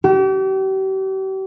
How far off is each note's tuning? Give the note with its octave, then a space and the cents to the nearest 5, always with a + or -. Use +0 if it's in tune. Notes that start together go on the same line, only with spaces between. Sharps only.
G4 -40